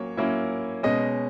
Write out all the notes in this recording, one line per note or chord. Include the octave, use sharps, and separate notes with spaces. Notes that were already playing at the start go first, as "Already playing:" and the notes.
Already playing: F#3 A#3 C#4 C#5
F#3 A#3 C#4 E4
B2 G#3 C#4 D#5